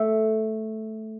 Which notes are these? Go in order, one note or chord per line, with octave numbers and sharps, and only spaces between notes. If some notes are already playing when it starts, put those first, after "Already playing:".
Already playing: A3